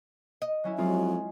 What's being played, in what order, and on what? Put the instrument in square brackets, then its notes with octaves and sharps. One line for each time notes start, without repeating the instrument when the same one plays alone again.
[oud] D#5
[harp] F#3 C#4 E4
[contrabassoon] F2 [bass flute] F#3 [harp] G#3 F4